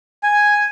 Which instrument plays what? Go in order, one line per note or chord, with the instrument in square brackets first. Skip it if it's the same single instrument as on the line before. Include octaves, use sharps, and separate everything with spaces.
[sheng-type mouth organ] G#5